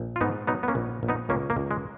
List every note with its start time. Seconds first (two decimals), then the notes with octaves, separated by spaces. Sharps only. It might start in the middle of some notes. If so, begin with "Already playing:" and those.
Already playing: A#1
0.16 F4
0.21 G#2 B3 D#4
0.47 F#3 B3 D#4
0.63 B3
0.68 A#3 C#4
0.75 A#1
1.03 A#1
1.09 B3 D#4
1.29 C#2 A#3 C#4
1.50 A#3
1.56 C#2
1.71 G#3